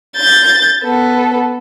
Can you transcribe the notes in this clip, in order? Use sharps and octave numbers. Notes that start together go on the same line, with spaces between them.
G6 A6
B3 A4